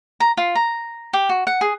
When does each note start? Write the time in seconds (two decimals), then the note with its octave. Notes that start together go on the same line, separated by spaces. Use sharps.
0.20 A#5
0.37 F4
0.55 A#5
1.13 G4
1.29 F#4
1.47 F#5
1.61 G#4